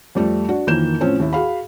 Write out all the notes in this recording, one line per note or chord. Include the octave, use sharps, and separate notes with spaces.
F2 G3 A3
D4 F#4
F2 D#3 E3 A#3 G6 E7
A2 F3 C4 C#4
D#2 E4
F#4 G#4 F5 B5